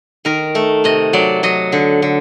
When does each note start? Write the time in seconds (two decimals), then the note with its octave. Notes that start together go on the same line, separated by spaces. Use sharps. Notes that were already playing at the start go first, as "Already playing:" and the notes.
0.25 D#3 A#4
0.55 A3
0.84 C3 D#5
1.13 F#3 D5
1.43 F#3 D#5
1.72 D3
2.02 D3